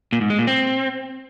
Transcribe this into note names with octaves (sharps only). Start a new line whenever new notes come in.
A#2
G#2
G#3
A#2
C4